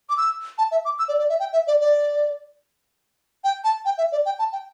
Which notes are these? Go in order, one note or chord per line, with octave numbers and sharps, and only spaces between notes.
D6
E6
A5
E5
D6
E6
D5
D5
E5
G5
E5
D5
D5
G5
A5
G5
E5
D5
G5
A5
G5